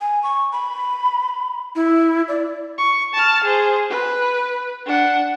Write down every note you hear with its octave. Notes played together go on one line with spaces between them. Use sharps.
G#5
C#6
B5
E4
D5
C#6
A5 F6
G#4 C5
B4
D4 F#5